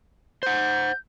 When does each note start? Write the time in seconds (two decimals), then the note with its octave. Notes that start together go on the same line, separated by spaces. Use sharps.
0.43 C5 F#5 G6